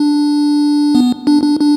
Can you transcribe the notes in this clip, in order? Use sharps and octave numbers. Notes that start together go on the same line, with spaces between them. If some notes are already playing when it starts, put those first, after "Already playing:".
Already playing: D4
B3
D4
D4
D4